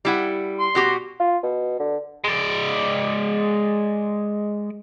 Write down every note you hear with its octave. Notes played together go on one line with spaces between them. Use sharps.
G3 E4 F#5
C6
B2 F#4 G4
F4
B2
D3
G#3 D5